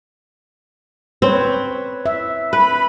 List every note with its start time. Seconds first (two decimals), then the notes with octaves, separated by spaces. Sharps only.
1.22 C4 B4 C#5
2.06 E5
2.53 B4 B5